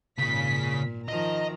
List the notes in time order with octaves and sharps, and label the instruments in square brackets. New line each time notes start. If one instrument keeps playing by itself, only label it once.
[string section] G#1 B6 [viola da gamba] A#2 [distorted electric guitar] C#3 G#4
[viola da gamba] D#3 F3 [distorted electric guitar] D#5 [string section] A#5